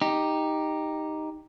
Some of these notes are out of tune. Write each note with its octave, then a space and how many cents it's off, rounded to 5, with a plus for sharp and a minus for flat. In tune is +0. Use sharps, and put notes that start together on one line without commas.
D#4 +0 G4 +5